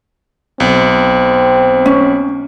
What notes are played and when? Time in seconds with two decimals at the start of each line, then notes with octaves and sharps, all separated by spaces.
0.60 B1 C4
1.86 C#4